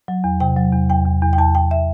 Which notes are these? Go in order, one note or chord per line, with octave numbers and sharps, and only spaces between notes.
F#3
E2
C3 G5
F#3
E2
E2 G5
E2
E2
G5
E2 A5
E2 G5
E5